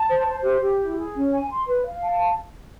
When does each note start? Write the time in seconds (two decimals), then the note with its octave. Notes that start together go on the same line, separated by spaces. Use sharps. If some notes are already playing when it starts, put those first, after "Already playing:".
Already playing: A5
0.09 C5
0.27 C5
0.44 G4
0.62 G4
0.80 E4
0.97 G#4
1.15 C#4
1.32 G#5
1.50 C6
1.68 B4
1.85 F5
2.03 A5